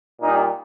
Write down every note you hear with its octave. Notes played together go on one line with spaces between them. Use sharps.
A#2 G3 D#4